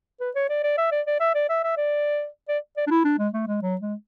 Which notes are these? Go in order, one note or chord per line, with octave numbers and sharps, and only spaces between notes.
B4
C#5
D5
D5
E5
D5
D5
E5
D5
E5
E5
D5
D5
D5
D4
E4
D4
G#3
A3
G#3
F#3
G#3